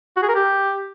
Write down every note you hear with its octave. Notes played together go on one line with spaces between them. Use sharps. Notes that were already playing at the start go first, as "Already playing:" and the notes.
F#4
G#4
A#4
G4